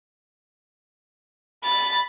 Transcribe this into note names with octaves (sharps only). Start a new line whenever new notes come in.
B5 A6